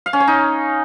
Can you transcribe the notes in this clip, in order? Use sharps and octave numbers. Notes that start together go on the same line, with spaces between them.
F5
C#4
C#5
D#4